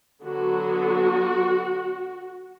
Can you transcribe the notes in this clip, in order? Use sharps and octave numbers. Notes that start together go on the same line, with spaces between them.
D3 F#3 B3 F#4